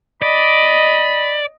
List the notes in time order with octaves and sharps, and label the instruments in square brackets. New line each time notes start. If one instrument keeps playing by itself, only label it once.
[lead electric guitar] D5 [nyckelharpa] D#5 [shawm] B5